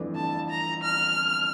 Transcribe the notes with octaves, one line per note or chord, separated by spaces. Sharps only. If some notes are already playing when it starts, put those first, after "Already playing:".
Already playing: G1 F2 E3 A3 D4
A5
A#5
F6